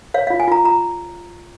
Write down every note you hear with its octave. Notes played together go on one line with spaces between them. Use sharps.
C#5 F5
F4 F5
G#5
F4 A#5
F4 A#5